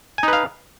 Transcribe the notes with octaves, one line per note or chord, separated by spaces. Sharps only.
D#4 B4 F5 G#5